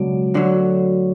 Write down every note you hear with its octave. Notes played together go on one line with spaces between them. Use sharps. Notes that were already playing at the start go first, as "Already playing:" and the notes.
Already playing: C#2 B2 F#3 D4
D2 D3 F#3